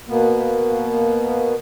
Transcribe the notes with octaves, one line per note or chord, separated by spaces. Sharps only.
B2 A#3 B3